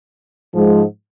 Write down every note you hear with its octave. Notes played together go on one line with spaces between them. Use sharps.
G#2 F3 G#3